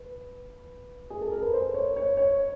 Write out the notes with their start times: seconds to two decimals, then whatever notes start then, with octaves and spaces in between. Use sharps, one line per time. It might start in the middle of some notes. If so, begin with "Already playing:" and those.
Already playing: B4
1.10 G#4
1.21 A4
1.31 A#4
1.42 B4
1.53 C5
1.74 C#5
1.96 C#5
2.17 C#5